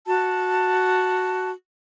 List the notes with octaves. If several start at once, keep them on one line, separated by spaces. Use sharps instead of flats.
F#4 A5